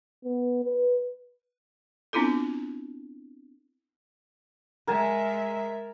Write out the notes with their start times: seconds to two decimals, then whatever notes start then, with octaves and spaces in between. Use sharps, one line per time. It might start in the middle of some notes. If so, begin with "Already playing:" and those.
0.25 B3
0.64 B4
2.13 B3 C4 D4 E4 F4 A4
4.87 G#3 A#4 E5 G#5 A5